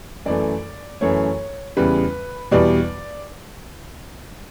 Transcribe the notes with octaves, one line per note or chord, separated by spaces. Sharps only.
F#2 E3 A3 D5
F#2 E3 A3 C#5
E2 C#3 G3 B4
E2 B2 G3 D5